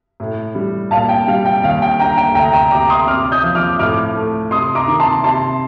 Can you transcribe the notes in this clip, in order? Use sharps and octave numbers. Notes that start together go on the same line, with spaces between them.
A2
G3
A#2 F5 A5
G5
G3 F5
G5
D#2 F5
G5
D3 G5 A#5
G5
D2 G5 A#5
G5 A#5
C3 A#5 D6
C6 D#6
C3 D6 F6
D#6 G6
F3
D6 F6
A2 D6 F6
A3
C3 C6 D#6
A#5 D6
D#3
A5 C6
C3 A5 C6